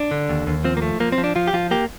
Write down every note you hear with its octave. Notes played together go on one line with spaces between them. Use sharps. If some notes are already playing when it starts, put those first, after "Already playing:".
Already playing: D4
D3
D#2
D#2
F3 C4
A#3
A3
F3 A#3
C4
F3
D4
F3 F4
G4
F3 F4
A#3 G4